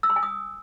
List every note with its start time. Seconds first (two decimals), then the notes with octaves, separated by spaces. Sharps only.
0.03 E6
0.10 C6
0.16 G#5
0.23 D#6